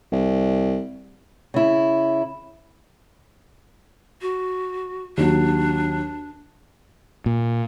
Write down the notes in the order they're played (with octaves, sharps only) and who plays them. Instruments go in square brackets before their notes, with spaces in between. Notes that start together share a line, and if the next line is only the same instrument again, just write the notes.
[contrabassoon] C2
[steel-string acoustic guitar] C#3 E4
[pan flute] F#4
[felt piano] D#2 F#3 [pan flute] D4
[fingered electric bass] A#2